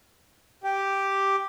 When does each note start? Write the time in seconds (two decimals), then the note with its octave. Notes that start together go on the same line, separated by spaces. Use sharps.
0.64 G4